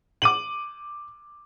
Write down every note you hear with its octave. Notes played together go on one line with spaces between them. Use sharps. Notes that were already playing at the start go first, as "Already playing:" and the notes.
D6 D#7 F#7